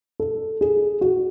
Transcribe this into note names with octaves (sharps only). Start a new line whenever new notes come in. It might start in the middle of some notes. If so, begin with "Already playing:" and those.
A4
G#4
F#4